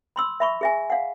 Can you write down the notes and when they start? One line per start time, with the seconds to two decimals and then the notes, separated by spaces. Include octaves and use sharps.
0.16 B5 C6 E6
0.40 E5 B5 C#6
0.61 G#4 E5 G#5
0.90 F5 F#5